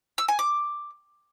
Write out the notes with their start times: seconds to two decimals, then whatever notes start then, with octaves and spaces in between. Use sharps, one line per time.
0.18 E6
0.28 G#5
0.39 D6